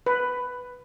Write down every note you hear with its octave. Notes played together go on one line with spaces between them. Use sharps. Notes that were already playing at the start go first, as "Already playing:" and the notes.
B4